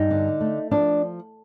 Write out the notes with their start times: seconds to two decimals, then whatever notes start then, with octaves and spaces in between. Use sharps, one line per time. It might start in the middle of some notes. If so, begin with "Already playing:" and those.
Already playing: G2 D#4
0.11 D3
0.41 A3
0.71 F3 D4